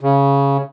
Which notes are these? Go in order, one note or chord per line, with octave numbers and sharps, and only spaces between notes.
C#3